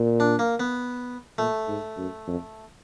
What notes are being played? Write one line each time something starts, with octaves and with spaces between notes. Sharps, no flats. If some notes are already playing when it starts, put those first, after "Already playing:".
Already playing: A#2
D4
A#3
B3
A#2 A3
G#2
F#2
F2